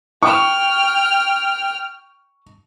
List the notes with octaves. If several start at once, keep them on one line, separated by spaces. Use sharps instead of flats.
G5 C#6 F6